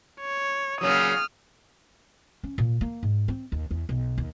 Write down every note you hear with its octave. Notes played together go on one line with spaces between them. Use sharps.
C#5
A#2 C#3 F#3 D#6 F6
C#4
A#2
A#3
G#2
C4
D#2
E2
B1
D#2